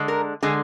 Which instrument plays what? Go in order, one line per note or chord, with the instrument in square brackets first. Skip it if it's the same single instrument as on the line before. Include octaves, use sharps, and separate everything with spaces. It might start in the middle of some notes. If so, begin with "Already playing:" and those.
Already playing: [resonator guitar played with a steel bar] D3 G#3
A#4
D3 G#3 G#4